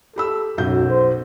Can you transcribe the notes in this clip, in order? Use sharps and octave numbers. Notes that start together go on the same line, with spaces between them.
G4 A4 B5 E6
B1 F#2 F#4 G6
C5